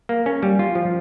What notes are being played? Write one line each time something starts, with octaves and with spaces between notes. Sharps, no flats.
A#3
C#4
G3
F4
F3